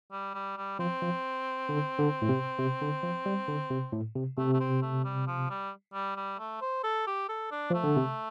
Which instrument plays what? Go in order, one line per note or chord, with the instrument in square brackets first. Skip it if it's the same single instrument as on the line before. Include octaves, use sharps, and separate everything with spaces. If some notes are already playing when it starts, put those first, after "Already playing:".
[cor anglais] G3
G3
G3
[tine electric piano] F3 [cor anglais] C4
[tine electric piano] F3
D3
D3
A2
C3
C3
D3
F3
G3
D3
C3
A2
C3
[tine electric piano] C3 [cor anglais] A3
[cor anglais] A3
C4
A3
G3
F3
G3
G3
G3
A3
C5
A4
G4
A4
D4
[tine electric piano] F3 [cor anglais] A3
[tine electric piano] D3
C3